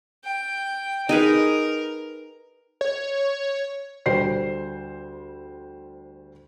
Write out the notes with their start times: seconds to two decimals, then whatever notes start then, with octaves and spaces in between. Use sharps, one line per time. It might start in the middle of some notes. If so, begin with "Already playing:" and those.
0.25 G5
1.09 D#4 G#4 A#4 B4
2.81 C#5
4.06 D2 G3 C5 C7